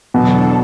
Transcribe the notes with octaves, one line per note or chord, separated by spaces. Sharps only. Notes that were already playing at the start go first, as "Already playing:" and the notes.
E2 B2 D3 F#3 D4 A4